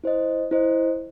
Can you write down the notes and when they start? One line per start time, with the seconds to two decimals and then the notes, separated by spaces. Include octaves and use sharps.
0.04 E4 C5 D#5
0.51 E4 C5 D#5